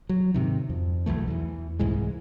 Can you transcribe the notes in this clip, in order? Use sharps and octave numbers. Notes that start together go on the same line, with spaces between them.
F#3
G#2 C3 D#3
F2
B1 E2 E3 A3
E2 E3
C2 G#2 E3 G#3